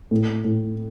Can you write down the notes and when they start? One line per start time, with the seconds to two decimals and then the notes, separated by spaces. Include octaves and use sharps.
0.11 A2
0.44 A2